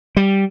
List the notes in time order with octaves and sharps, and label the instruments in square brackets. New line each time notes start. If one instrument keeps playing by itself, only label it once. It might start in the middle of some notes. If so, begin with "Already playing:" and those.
[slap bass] G3